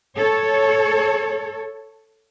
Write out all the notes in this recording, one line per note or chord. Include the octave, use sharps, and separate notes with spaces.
A4 C#5